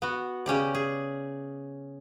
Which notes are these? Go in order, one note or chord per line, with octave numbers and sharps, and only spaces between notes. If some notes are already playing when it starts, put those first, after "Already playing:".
B3 F#4
C#3 C#4 G4 D5
G#4